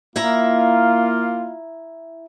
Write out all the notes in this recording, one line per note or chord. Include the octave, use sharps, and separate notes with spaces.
A#3 E4 F4 E5 A#5